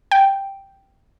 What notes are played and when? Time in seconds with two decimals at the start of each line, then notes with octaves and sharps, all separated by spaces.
0.11 G5